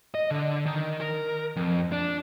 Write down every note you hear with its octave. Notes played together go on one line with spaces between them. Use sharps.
D#5
D3
D#3
A#4
F2
D4